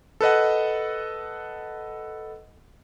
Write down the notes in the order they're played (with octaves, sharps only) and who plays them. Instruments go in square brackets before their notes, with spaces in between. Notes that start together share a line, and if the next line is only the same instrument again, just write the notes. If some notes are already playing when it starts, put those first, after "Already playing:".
[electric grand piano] A4 B4 D#5 F#5